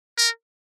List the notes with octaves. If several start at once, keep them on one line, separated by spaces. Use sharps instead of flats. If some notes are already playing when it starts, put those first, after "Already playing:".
A#4